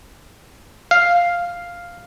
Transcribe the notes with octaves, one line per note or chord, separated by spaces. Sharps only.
F5